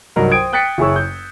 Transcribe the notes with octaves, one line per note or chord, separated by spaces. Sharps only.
C2 G2 F#3 D#4 A#4 F#5
C5 G5 D#6 G#6 D7
G5 D#6 F#6 A6 B6 C#7
F#1 E4 G#4 C#5 C#6 E6
G6